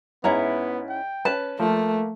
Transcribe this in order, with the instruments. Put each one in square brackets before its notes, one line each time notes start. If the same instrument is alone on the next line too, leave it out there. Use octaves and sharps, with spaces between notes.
[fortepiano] G#2 [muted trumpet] B3 [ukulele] C#4 E4 A#5
[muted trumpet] G5
[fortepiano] C#4 B4 [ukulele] A5
[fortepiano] F3 [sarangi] A3 [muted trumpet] A#3